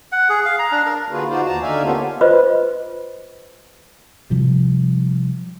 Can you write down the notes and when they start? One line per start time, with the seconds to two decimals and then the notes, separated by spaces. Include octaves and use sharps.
0.12 F#5
0.29 G#4
0.45 F5
0.59 A#5
0.72 D4
0.86 A#4
1.08 D3 A#3 F4 F#4 G#4 B4
1.28 D#4 F4 F#4 C5 D5
1.45 D#2 A5 A#5
1.62 D3 D#4 D5 E5 F5 G#5
1.82 A#3 B3 C#4 F4 G4 A4
2.21 F4 B4 C5 D#5
4.30 C3 F3 G3